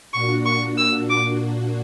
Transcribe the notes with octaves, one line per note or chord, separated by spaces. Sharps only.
A#2 A#3 D4 F#4 C#6
C#6
E6
D6